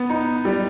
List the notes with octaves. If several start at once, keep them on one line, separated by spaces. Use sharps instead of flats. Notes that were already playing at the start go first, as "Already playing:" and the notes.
Already playing: B3
D#4
G3